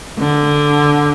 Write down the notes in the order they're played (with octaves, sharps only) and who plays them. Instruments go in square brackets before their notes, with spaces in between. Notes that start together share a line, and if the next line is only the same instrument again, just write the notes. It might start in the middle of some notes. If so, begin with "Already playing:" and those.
[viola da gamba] D3